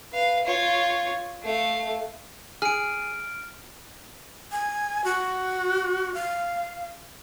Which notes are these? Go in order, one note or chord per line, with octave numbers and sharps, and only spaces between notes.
B4 F5
F4 C#5
A3 F5
G#4 F6 D7
G#5
F#4
F5